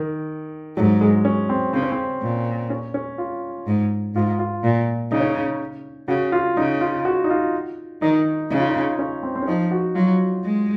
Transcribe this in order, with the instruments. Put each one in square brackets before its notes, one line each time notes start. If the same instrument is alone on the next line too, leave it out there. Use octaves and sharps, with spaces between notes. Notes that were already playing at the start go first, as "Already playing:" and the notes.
Already playing: [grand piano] D#3
[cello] G#2 [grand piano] F#3
[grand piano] G#3
C#4
C4
[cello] C#3 [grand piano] C4
[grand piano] C#4
C4
[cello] A#2
[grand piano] C#4
C#4
F4
[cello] G#2
[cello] G#2 [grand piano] F4
[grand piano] F4
[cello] A#2
[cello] C#3 [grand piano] D#4
[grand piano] C#4
D#4
[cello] C#3 [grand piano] F#4
[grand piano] F4
[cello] C#3 [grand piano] D#4
[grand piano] F4
F#4
D#4
F4
[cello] D#3 [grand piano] D#4
[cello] C#3 [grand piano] D#4
[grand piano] F4
D#4
C#4
C4
C4
C#4
[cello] F3 [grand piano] D#4
[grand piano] F#4
[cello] F#3 [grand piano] F4
[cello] G#3